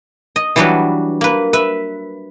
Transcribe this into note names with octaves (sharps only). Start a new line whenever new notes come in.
D#5
E3 F#3 G3 D4 F#4 B4
A#3 B4
B4 E5